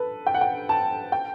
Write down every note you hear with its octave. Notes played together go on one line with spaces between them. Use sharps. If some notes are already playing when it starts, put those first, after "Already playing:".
Already playing: A4 B4
G5
F#5
G5
A5
G5